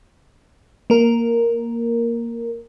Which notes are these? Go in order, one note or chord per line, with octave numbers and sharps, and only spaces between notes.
A#3 A#4